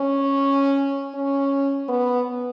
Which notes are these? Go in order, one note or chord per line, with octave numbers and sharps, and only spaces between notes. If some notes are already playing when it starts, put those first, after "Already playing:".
Already playing: C#4
C#4
B3